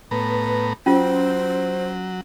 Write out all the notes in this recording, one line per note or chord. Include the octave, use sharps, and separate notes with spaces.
A2 B3 B4 A#5
F#3 C#4 F4 C5